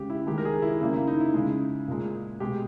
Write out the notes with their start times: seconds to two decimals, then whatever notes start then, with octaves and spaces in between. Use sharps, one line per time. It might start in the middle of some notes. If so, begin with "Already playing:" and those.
Already playing: C#3 G#3 G4
0.10 E4
0.27 D#3 G#3 G4
0.38 A#4
0.45 G#4
0.62 E4
0.81 C#3 G3 A#3 E4
0.94 E4
1.07 D#4
1.20 E4
1.34 C#3 G#3
1.88 A#2 G#3
2.40 B2 G#3 G4